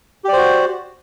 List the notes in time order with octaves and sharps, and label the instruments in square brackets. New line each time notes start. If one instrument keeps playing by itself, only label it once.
[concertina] G4
D5
C5
F#4